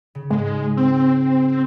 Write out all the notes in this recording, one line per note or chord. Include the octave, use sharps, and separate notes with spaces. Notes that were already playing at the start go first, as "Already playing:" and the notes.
C#3
G#2 G#3
C4